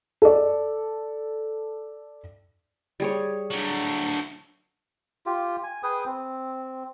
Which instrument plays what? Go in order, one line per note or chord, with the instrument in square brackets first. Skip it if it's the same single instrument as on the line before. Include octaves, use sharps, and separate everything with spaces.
[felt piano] A4 D5
[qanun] G3 G#4 C#5
[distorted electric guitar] D3 F#3
[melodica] F4 G4
G#5
G#4 B4 G5 D#6
C4